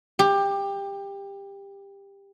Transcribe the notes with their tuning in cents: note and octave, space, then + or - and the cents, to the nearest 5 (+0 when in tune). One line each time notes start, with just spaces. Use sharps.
G4 +20